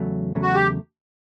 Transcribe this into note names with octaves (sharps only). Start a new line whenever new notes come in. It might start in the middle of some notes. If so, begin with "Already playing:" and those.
Already playing: E2 C#3 F#3 A3
E2 C#3 F#3 A3
F#4
G4